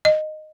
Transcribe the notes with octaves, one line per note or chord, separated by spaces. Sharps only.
D#5